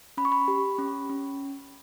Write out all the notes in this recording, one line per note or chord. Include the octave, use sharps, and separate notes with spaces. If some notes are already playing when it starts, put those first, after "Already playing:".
C#4 B5
C#6
B5
G4
C#4
C#4